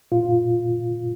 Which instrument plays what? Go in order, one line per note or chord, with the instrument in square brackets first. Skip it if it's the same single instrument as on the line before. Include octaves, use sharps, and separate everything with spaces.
[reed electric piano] A#2 F4